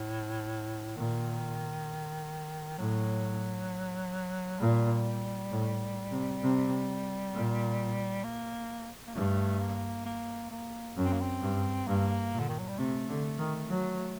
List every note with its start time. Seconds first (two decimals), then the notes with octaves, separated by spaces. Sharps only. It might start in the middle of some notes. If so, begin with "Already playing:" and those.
Already playing: A2
0.96 A#2 D#3
2.78 A2 F#3
4.59 A#2 G3
5.50 A2
6.11 C3
6.42 C3
7.33 A#2
8.24 A#3
9.07 A#3
9.14 G2 A3
9.60 A#3
10.05 A#3
10.51 A#3
10.97 F#2
11.05 C4
11.13 A#3
11.21 C4
11.42 G2
11.87 G2 A#3
12.33 A#2
12.39 D3
12.49 D#3
12.59 F#3
12.68 G3
12.78 C3 A3
13.09 D3
13.39 D#3
13.69 F#3